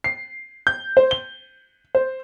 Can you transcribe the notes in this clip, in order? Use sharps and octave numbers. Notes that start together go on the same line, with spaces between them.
C7
G6
C5
G7
C5